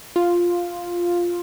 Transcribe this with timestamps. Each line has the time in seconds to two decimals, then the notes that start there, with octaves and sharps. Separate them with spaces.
0.16 F4